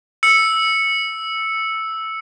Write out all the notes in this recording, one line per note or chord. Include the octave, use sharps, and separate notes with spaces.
E6 C#7